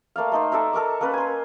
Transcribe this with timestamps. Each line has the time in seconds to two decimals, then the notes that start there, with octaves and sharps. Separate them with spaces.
0.16 A3 A#3 D5 F5
0.32 A3 D#4 C5
0.52 A4 D5 E5 A#5
0.73 A4 A#4 C#6 D6
1.01 A#3 C#4 A#4 B4
1.14 G#5 C6